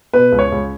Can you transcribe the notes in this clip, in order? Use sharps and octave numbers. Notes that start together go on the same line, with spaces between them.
B2 B4
C#2
C#5
C#2